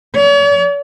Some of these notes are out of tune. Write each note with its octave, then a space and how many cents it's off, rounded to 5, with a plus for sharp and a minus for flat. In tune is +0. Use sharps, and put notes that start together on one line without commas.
C#5 +45